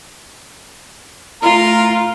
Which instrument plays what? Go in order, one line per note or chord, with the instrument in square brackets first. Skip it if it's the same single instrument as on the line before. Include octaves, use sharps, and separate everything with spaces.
[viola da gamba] A3 F4 [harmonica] A#4